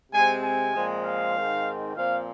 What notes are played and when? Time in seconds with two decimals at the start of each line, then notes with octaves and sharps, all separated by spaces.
0.12 C3 G#3 C4 G#5
0.43 G#5
0.74 A#2 F3 G#3 C4
1.04 F5
1.36 G#2 D#3 C4
1.96 A#2 F3 C4 F5